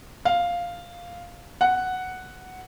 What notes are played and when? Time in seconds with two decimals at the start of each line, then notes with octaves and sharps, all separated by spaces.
0.25 F5
1.61 F#5